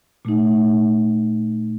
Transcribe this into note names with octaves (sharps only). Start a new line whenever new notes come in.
A#2 A3 D#4